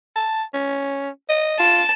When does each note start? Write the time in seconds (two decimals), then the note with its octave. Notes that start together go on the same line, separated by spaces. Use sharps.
0.16 A5
0.54 C#4
1.29 D#5
1.59 F4 A5